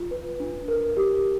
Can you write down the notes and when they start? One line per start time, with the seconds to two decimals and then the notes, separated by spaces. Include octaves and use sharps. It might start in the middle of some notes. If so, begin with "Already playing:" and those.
Already playing: F4
0.11 B4
0.40 D4
0.68 A#4
0.97 G4